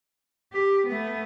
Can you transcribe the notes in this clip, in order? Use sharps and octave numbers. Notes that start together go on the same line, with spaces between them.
G4
A3 B3